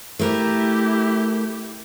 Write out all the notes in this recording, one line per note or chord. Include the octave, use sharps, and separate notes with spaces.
A3 E4 G4 A#4